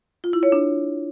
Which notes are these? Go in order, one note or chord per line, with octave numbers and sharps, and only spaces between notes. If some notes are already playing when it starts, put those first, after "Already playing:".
F4
E4
C#5
D4